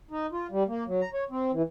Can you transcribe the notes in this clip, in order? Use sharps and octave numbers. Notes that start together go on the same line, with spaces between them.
D#4
F4
G3
A#3
F#3
A#5
C#5
C4
E3